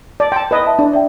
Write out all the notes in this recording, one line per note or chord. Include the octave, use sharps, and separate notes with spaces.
D5 A5
G5 A5 C6
B4 D#5
E5 A5
D4
D5 E5 G5